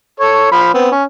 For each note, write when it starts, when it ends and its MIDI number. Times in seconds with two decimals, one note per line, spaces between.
0.20 0.49 69
0.20 0.49 73
0.51 0.70 53
0.51 0.70 83
0.74 0.90 59
0.74 0.90 60
0.91 1.04 61